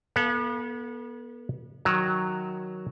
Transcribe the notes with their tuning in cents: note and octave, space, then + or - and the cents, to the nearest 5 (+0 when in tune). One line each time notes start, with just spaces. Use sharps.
B3 -35 A4 +0 F5 +0
D#3 +0 F#3 +0